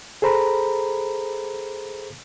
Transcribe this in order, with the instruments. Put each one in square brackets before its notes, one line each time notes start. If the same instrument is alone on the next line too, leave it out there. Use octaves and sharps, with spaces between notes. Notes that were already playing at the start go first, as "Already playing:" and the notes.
[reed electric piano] G#4 A4 C5 A#5 B5